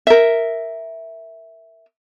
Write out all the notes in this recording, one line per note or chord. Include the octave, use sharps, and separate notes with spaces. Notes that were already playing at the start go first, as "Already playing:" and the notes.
A#4 E5